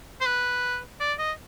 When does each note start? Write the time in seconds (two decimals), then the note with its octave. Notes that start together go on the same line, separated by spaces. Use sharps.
0.21 C5
0.26 B4
1.00 D5
1.19 D#5